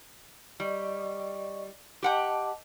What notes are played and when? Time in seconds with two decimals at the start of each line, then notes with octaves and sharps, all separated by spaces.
0.60 G3 D5 D#5 C#6
2.03 G4 D#5 F#5 G5 A5 D6